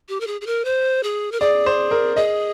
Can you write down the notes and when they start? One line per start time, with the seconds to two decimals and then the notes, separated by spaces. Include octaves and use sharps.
0.09 G4
0.20 A#4
0.27 G#4
0.41 G#4
0.47 A#4
0.65 C5
1.03 G#4
1.32 A#4
1.40 G#4 D5
1.66 C5
1.91 A#4
2.16 G#4 D#5